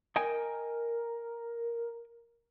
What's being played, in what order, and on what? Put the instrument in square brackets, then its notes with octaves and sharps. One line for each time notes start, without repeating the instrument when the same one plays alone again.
[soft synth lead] A#4 [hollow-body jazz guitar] D#5 G5 G#5